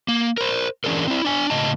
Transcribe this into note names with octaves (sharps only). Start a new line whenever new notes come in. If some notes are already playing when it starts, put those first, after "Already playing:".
A#3
A#4 C5
E3 C#4 D4 G#4 A#4
C4 E4
D4 G#5
A2 C#3 D#5 A5